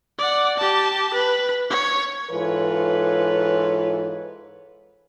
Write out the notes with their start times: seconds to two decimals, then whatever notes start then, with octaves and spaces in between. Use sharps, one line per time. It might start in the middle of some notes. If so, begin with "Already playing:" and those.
0.18 D5 F#5
0.57 G4 A5
1.14 B4
1.70 C#5
2.31 G#2 E3 F4 A4 B4 C#5